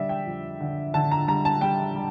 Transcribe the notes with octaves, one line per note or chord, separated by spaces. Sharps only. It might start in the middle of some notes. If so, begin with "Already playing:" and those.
Already playing: D3 G3 D5 E5
G5
F2
D3
D3 A5
A#5
G3 A#5
A5
G3 G5
G3